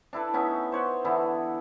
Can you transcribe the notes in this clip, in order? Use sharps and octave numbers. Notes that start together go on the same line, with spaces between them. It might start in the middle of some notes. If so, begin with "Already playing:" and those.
D4 E4 A4 B4
B3 C#4 D#4 E5
C5 C#5 F#5
D3 E3 B3 E4